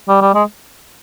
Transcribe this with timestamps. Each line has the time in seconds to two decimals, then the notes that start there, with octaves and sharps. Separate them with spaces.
0.08 G3
0.21 G3
0.34 G#3